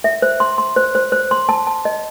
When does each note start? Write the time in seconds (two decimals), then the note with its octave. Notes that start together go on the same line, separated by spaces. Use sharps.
0.04 E5
0.22 C5
0.40 C6
0.58 C6
0.76 C5
0.95 C5
1.12 C5
1.31 C6
1.49 A5
1.67 A5
1.85 D#5